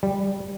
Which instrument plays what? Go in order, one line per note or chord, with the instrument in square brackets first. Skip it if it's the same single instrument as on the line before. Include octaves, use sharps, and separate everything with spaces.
[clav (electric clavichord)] G3